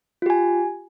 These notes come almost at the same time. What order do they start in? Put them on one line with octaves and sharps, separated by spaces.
F4 G4 G#5